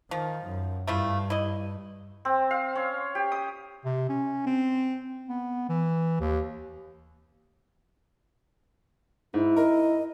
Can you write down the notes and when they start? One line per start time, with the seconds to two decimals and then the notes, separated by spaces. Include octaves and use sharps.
0.11 D#3 F3
0.46 F#2
0.87 G2 A3 E4 F4
1.30 E4 D#5
2.25 C4
2.51 F5
2.75 C#4
3.15 G4
3.32 D#6
3.85 C3
4.09 C#4
4.46 C4
5.29 B3
5.69 E3
6.20 D#2
9.34 G#2 E4
9.57 A#4 D#5